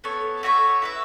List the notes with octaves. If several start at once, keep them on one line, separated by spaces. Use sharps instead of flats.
B3 A4 C#5
A3 F#4 C#5 E5
E4 B4 E5